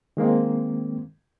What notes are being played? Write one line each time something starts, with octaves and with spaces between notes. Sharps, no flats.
D#3 G#3 A#3 C4